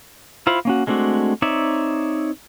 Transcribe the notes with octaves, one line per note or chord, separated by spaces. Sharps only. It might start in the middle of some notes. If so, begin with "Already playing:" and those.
E4 F4 C5 B5
A#3 C#4 F#4
G#3 A3 C4 D4 F#4
C4 D#4 C#5 D5 E5